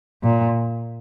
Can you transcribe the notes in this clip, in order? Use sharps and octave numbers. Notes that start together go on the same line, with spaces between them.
A#2